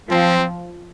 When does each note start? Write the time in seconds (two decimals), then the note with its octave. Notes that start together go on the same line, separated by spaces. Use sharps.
0.11 F3 C4